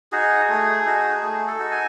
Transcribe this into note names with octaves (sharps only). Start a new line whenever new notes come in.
D#4 F#4 G#4
A3
D#4 F#4
A3 G#4
A4
D#4 F#4
G#5